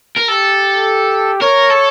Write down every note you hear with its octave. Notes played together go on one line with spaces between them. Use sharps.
A#4
G4 A4
A#4 C#5
A4